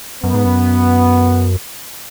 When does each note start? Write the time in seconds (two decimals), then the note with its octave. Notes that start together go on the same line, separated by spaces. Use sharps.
0.23 F#2 B3
0.34 G#2
0.45 F#2